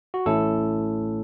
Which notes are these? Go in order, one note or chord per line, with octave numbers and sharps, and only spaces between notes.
F#4
A1 A2 A3 C#4 E4 A4